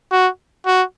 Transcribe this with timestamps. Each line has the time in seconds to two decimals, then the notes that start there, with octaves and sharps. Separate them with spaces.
0.12 F#4
0.66 F#4